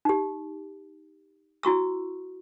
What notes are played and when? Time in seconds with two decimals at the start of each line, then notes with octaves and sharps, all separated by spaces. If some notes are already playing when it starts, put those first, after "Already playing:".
0.05 D#4 G4
1.63 E4 F#4 C#6 E6